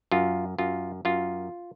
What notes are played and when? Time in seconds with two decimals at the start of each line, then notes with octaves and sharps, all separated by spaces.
0.11 F#2 F4
0.58 F#2 F4
1.05 F#2 F4